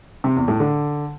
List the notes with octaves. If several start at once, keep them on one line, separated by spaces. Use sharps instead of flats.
C3
E2
A2
D3